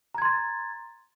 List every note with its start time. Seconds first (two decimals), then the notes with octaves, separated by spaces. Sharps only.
0.15 A#5
0.18 G#6
0.22 C6
0.25 A6